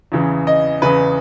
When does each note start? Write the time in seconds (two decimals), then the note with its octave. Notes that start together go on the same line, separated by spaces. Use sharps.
0.12 E2 C#3 E3
0.47 D#5
0.82 E2 C#3 E3 B4